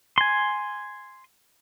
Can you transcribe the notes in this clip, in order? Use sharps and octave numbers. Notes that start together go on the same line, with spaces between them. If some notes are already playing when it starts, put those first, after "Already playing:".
G#5 C6